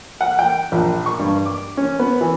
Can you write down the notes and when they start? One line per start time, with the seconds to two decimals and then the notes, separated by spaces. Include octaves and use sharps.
0.21 F#5
0.39 G5
0.72 A#1
1.06 C#6
1.19 G2
1.46 D6
1.77 C#4
1.99 B3
2.21 E3